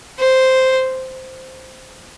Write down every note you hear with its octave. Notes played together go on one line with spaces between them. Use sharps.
C5